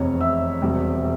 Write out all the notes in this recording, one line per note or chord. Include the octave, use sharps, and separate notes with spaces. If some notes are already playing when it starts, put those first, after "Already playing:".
Already playing: F1 E2 C3 C#5
E5 E6
E1 E2 C3 G3